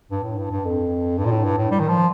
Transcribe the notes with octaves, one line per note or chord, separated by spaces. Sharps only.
G2
A2
G2
G2
F2
G2
A#2
A2
G2
A2
G3
D#3
F3